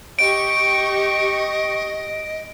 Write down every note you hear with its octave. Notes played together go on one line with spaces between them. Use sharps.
G4 D#5 C#6 D7